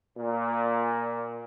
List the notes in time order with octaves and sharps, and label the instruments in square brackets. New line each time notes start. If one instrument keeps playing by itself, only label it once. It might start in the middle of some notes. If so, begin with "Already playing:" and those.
[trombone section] A#2